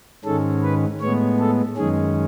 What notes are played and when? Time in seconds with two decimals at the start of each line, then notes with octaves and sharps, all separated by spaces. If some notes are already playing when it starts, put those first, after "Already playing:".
0.24 G#2 D#3 G#3 C#4 A4
0.62 B4
1.01 A2 G#3 B3 C#5
1.39 A4
1.77 F#2 D#3 G#3 C#4 G#4